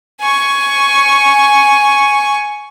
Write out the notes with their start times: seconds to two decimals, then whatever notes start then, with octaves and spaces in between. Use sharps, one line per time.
0.21 G#5 C#6